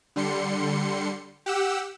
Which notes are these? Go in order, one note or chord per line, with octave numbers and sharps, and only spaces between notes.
D3 G3 C6 C#7
G4 F#5 E6